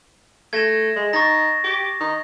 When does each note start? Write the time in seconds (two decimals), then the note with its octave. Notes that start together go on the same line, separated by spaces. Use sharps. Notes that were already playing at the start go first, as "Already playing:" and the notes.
0.53 A3 G#6 A#6 E7
0.96 G#3
1.13 D#4 C#6 A6 A#6
1.64 G4
2.00 D#4